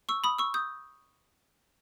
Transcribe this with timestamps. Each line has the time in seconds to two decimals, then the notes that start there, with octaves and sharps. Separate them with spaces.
0.09 C#6 E6
0.24 B5 D#6
0.38 C#6 E6
0.54 D#6 G6